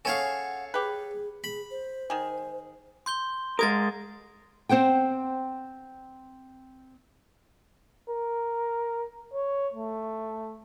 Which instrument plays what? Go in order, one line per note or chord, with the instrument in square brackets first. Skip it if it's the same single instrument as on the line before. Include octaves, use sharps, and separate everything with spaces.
[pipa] C#4 G#4 [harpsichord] A4 C#5 F5 [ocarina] F#5
[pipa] G4 B4 [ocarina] G#4
[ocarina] G#4 [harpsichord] B5
[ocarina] C5
[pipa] D#3 G#4
[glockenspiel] C6 G6 G7
[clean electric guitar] G#3 A#4 [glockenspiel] D#6 G#6 A6
[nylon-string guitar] C4 C5 F#5 G5
[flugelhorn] A#4
C#5
A3